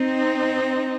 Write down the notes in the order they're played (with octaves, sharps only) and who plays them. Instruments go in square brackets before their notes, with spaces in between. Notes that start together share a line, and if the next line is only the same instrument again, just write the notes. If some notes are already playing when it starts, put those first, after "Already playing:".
Already playing: [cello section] C4 D#4